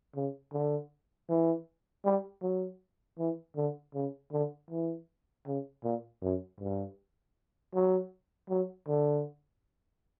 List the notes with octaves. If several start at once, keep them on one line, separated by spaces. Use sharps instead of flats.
C#3
D3
E3
G3
F#3
E3
D3
C#3
D3
E3
C#3
A#2
F#2
G2
F#3
F#3
D3